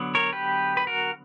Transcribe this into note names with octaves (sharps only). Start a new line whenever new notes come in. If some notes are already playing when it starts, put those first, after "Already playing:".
Already playing: D3 F#3 B3
A#4 C#5
G4 B4
B4
F#4 A#4